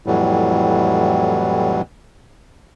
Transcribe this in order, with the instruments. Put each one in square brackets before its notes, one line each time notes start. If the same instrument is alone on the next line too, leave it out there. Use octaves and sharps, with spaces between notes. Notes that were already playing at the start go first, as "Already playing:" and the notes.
[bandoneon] F2 A2 E3 F#3 G3